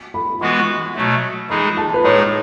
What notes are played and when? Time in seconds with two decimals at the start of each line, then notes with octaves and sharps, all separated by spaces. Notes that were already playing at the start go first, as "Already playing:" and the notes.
0.14 B5
0.41 E3 G#3 B3 F#4 B4 C#6
0.95 B2 F#3 A3
1.50 E3 G#3 D#4 G#4 B5
1.77 A5
1.94 B4
2.03 A2 G#3 D#4 G#4 C#5